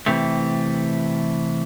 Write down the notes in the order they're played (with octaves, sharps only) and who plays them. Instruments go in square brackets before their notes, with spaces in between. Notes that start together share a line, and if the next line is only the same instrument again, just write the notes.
[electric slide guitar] C3 E3 A3 G4